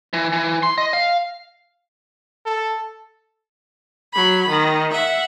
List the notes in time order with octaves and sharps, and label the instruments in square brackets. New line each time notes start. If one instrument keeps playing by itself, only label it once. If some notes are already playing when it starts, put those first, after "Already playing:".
[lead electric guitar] E3
E3
C6
D#5
F5
[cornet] A4
[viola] F#3 B5
D#3
E5 F#5